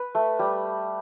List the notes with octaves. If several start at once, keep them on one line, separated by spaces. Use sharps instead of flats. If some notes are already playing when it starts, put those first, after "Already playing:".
Already playing: B4
A3
G3